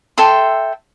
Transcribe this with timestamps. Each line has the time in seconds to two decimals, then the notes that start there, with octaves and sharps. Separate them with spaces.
0.18 A4 E5 G5 C6